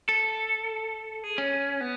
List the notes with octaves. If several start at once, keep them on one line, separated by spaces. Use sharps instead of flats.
A4
G#4
C#4
B3